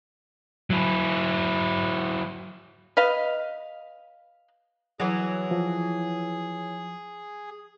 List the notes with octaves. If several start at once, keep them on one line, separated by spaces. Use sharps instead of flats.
F#3 E4
B4 D#5 F5
E3 F#3 G#4
F3